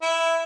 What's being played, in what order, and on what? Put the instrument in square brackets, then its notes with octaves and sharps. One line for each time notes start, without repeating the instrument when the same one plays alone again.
[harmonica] E4